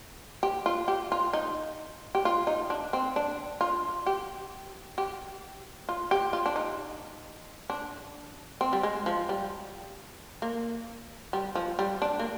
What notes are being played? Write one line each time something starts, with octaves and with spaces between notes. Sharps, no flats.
G4
F4
G4
F4
D#4
G4
F4
D#4
D4
C4
D4
F4
G4
G4
F4
G4
F4
D4
D#4
D4
C4
G3
G#3
F3
G3
A#3
G3
F3
G3
D4
A#3